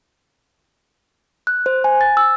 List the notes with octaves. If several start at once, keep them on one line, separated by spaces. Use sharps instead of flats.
F#6
C5
G#5
A6
E6